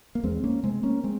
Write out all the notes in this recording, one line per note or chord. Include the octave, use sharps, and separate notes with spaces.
A#3
E2 G#3 C4
A#3 C#4
C3 G#3 C4
A#3 C#4
G#3 C4